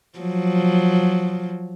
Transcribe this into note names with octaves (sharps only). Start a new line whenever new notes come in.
F3 F#3